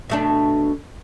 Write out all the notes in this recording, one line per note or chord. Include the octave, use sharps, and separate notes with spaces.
B2 A3 D4